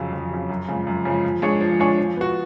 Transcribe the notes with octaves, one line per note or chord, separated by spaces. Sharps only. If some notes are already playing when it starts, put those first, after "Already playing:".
Already playing: F2 C#3 F#3
F2
C#3 F#3
F#2
C#3 F3 G#3
F#2
C#3 F3 G#3
F3
G#3 D4 G#4 C#5
F3
G#3 D4 G#4 C#5
F3
B3 F#4